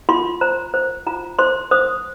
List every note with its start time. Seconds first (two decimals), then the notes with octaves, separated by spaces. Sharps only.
0.09 F4 C6
0.41 C5 A#5
0.74 C5
1.06 F4 A#5
1.39 C5 C6
1.71 C5 D#6